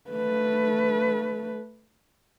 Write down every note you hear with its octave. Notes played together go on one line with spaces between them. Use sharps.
A3 B4